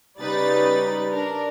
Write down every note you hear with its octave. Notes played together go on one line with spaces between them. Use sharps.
C#3 G3 D#4 B4 D5 A6
D4 A#4